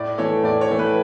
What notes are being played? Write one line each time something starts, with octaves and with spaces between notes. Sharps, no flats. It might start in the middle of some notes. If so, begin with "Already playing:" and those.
Already playing: A2 D5
E3 A3 C#5
A2 D5
C#5
E3 A3
B4